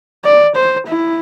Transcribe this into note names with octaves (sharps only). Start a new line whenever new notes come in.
D5
C5
E4